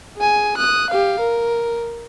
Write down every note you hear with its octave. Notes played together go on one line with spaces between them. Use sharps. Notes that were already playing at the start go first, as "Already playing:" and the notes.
G#4 G#5
D#6 F#6
G4 F5
A#4